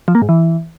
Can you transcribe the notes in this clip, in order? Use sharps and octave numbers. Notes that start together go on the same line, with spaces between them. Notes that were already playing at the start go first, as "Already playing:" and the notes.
F3
A#3
G#2
E3